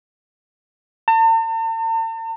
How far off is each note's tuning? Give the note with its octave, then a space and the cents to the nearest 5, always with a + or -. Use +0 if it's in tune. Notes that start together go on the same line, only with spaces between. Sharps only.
A5 +45